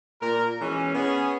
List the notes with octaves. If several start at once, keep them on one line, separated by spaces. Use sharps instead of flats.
A#2 A#4
B2 E3 G#3 C#4
B3 C#4 G#4